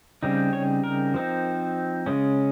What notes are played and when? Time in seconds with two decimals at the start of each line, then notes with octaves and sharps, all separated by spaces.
0.23 C#3 G3 C4 D#4
0.53 C#5
0.84 A#4
1.14 F3 C4 D#4
2.06 C#3 G#3 C#4